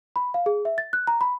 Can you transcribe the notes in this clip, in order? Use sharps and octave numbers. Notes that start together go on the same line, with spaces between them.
B5
F5
G#4
E5
A6
F#6
A#5
B5